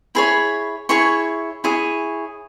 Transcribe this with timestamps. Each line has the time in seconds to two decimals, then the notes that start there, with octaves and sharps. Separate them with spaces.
0.15 E4 G#4 C#5 B5
0.89 E4 G#4 C#5 C#6
1.64 E4 G#4 C#5